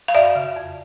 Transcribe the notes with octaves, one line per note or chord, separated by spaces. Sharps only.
F5
F#2 D5 E5
C#3
F2